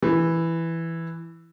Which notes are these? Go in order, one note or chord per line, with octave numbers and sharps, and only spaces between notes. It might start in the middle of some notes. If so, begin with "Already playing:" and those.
E3